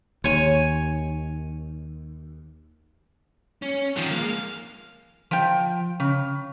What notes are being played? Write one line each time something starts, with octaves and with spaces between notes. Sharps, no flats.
D#2 C#5 G#5
C#4
D3 D#3 F3
G#3 A#3 F5
F3 G5
C#3